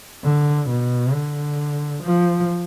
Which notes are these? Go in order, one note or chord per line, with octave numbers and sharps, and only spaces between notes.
D3
B2
D3
F3